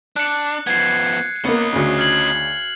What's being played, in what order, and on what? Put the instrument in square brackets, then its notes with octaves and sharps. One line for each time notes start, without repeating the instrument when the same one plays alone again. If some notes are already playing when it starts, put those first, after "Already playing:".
[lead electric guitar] D4 [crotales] F#6 C#7
[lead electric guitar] F3 B3 [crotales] G#6 C7
[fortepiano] A#3 B3 [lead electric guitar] C#4 D#5
[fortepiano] D2 C#3
[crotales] F6 G#6 F#7